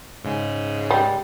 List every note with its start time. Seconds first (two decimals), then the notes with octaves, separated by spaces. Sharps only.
0.24 G#2 C#3 G#3
0.90 G3